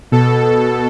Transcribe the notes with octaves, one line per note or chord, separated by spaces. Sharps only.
B2 A4